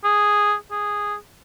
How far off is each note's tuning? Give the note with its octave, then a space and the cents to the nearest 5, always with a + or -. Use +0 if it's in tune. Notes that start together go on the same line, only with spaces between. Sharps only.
G#4 -5
G#4 -10